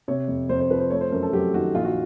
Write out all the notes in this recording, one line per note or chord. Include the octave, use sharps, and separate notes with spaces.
C3 C#5
F2
F2 C5
C5
F3 B4
C5
A3 C#5
C5
F#2 A#4
A4
F#3 G4
D#3 F#4
A#1 F4
F#4